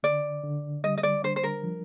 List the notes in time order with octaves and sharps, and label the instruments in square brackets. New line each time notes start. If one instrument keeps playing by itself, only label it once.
[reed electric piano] D3 [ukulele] D5
[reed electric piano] D3
[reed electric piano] G3 [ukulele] D#5
[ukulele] D#5
D5
[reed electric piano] D4 [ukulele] C5
[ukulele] C5
A#4
[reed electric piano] F3